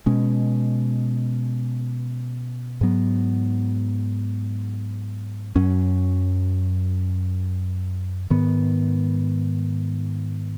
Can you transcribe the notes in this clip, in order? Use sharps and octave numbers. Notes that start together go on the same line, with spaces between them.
B2 G#3 C#4
G#2 F#3 B3
F#2 F#3 C#4
G#2 D#3 B3